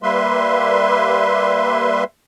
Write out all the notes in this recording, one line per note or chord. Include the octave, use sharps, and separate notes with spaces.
G3 A#3 B4 E5 C6